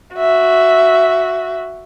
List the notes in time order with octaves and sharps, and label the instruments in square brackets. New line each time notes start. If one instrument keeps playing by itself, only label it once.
[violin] F#4 E5